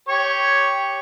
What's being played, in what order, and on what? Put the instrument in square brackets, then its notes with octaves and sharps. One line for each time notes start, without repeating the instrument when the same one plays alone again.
[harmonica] G4 C#5 C#6